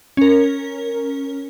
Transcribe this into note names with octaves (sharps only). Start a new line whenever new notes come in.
C#4 A#4